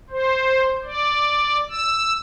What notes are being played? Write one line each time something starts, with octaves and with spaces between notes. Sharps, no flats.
C5
D5
E6